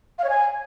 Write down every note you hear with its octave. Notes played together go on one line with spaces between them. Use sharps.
F5
C#5
G#5